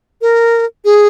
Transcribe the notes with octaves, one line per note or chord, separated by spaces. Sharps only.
A#4
G#4